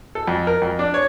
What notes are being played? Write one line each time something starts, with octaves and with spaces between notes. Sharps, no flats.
A4
F2
A#4
F2
D4
C#5